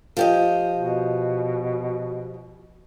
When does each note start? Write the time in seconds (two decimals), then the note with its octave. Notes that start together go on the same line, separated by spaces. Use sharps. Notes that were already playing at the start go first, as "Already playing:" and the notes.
0.17 F3 G4 D#5
0.75 B2